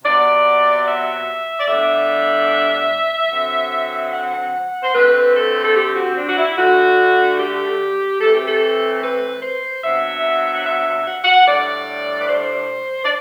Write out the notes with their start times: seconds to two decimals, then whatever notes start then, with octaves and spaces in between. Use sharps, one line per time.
0.04 C3 F#3 B3 D5
0.86 E5
1.58 D5
1.68 A2 G3 B3 D4 E5
3.31 D3 F#3 C4
4.12 F#5
4.83 C5
4.94 D3 A3 C4 B4
5.34 A4
5.64 A4
5.75 G4
5.96 F#4
6.16 D4
6.27 F#4
6.37 E4
6.57 D3 A3 D4 F#4
7.38 G4
8.20 E3 A3 C4 A4
8.34 G4
8.47 A4
9.01 B4
9.42 C5
9.83 C3 F#3 B3 D4 E5
10.54 F#5
10.65 E5
11.06 F#5
11.24 F#5
11.46 A2 G3 D4 D5
12.19 B4
12.28 C5
13.04 D5